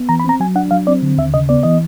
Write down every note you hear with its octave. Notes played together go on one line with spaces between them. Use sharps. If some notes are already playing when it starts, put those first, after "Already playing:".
Already playing: B3
E3 A#5
B5
C4 A#5
F#3 G#5
D4 F#5
F#3 F5
C4 D5
D3
D#2 E5
C#3 D#5
B3 D5
E3 D#5